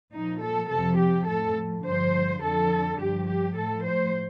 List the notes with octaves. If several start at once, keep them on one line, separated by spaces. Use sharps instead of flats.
A#2 F3 D#4
A4
F2 C3 F3 A4
G4
A2 F3 A4
G2 D3 F3 C5
F2 D3 F3 A4
G2 F3 G4
G4
A2 F3 A4
C5